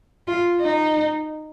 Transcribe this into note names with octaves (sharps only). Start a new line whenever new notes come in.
F4
D#4